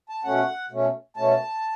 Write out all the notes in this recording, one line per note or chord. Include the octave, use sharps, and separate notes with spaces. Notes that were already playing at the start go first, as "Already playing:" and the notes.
A5
B2 A3 C#4 F#5
B2 A3 C#4
B2 A3 C#4 A5